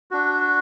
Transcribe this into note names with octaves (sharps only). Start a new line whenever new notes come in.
D4 F#4